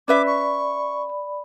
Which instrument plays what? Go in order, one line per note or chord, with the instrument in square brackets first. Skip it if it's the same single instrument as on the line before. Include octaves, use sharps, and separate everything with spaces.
[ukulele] C#4 B4 E5 [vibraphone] D5 B5 [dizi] D6
[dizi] C#6